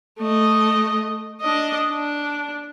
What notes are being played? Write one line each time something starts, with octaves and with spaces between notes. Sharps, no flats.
A3 D#5
D4 D#5
D4